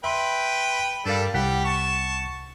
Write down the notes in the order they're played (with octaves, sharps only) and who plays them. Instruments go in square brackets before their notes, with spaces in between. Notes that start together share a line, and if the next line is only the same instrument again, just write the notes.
[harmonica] B4 G5 [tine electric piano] E5 C6
[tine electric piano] G2 A#4 F5 [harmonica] G3 D4 A4
[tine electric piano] C2 F#5 B6 [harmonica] G3 G4
[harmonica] A5 C#6